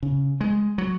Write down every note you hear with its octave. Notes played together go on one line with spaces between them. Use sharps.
C#3
G#3
F#3